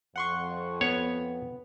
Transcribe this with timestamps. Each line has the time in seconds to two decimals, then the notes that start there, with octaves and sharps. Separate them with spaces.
0.16 F2 F#5 C6 C#6
0.81 B3 C#5